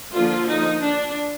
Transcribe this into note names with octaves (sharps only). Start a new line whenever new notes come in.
D3 F3 A#3 F4
D#4
D4